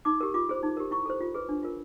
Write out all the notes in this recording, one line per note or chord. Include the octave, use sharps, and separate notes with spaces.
D#4 D6
G4 A#4
F4 D6
G#4 C5
D#4
G4 A#4
E4 C#6
A4 C5
F4
G#4 B4
D4
F4 A#4